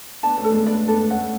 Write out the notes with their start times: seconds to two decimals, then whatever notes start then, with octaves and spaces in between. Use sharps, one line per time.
0.23 B3 D4 A5
0.37 A3 C#4
0.44 A4
0.52 G#3 B3
0.66 B3 D4 D5
0.88 B3 D4 A4
1.10 A3 C#4 F#5